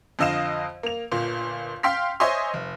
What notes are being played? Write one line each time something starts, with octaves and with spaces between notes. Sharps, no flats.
F2 D3 D#5 F5 E7
A#3 F7
G1 A#2
F5 G5 C6 F6 B6
C5 C#5 D#5 E5 G#5 C6
F1